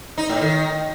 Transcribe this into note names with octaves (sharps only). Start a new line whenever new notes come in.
D#4
A2
D#3